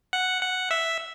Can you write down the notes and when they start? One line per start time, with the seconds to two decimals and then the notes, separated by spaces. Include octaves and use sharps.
0.13 F#5
0.42 F#5
0.71 E5